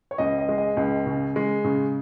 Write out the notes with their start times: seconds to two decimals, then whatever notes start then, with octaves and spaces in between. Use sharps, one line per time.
0.11 C#5
0.18 C#2 D#5
0.39 D#5
0.49 G#3
0.58 D#5
0.77 C#2
1.06 C#3
1.36 G#3
1.64 C#3